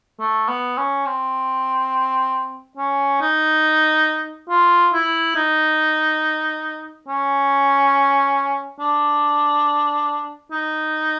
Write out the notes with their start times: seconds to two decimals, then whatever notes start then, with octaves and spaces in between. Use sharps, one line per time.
0.20 A3
0.48 B3
0.77 C#4
1.06 C4
2.77 C#4
3.21 D#4
4.49 F4
4.93 E4
5.36 D#4
7.08 C#4
8.80 D4
10.52 D#4